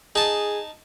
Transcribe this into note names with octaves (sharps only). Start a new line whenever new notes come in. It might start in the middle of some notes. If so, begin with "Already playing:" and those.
D#4 G#4 A5